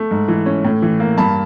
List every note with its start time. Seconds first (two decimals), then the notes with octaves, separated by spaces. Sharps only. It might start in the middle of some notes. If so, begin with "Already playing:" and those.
Already playing: A3
0.11 G#2
0.28 E3
0.46 C#4
0.64 A2
0.82 E3
1.00 A#3
1.18 G2 A5 B5